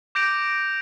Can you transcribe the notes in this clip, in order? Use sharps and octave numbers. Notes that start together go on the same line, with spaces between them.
D6 G6 A#6 D7 F7